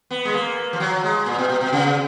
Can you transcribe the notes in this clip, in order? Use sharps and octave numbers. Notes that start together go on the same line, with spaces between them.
B3
G#3
A#3
F3
F#3
G#3
A#2
B2
B2
B2
C#3